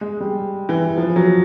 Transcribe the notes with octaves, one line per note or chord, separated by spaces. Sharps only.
G#3
G3
E3
F3
F#3